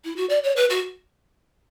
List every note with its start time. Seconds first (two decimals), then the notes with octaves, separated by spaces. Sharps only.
0.04 E4
0.16 F#4
0.29 D5
0.44 C#5
0.56 B4
0.70 F#4